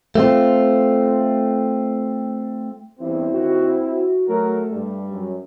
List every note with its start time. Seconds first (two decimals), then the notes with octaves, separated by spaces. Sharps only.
0.15 A3 C4 F4
3.00 E2 G2 C4 E4
3.31 D#2 F#4
3.87 F#4
4.28 F#3 A3 A#4
4.71 G2 G3
5.10 F#2